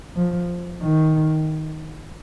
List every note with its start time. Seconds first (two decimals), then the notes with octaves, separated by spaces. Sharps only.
0.16 F3
0.82 D#3